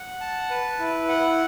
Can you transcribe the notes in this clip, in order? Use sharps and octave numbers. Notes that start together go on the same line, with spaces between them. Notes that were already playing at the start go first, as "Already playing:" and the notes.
Already playing: F#5
A5
B4
E4
F#5